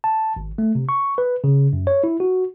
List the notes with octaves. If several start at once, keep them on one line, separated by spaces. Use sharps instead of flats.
A5
G#1
A3
C3
C#6
B4
C#3
F#2
C#5
E4
F#4